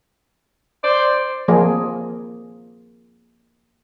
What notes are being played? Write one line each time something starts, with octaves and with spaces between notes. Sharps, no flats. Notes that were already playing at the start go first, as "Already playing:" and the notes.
C5 D5
F3 A#3 G#4